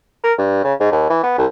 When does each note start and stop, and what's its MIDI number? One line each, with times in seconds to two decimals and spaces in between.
0.24 0.33 70
0.38 0.60 43
0.64 0.74 49
0.80 0.89 44
0.92 1.05 39
1.10 1.21 52
1.23 1.34 59
1.38 1.46 36